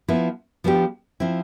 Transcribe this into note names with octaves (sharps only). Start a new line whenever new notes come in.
F3 B3 E4
F3 B3 D4 G4
F3 C4 E4